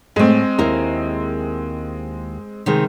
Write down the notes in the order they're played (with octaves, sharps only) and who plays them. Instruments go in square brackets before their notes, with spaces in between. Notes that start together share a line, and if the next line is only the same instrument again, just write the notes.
[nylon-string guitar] A2 A3 [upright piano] G#3 C4
[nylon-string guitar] D#2 E4 A#4
C3 D#3 G#3